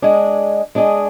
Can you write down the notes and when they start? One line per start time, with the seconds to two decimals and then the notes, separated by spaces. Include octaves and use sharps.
0.02 G#3 D4 G#4 D#5
0.75 G#3 D4 G#4 D#5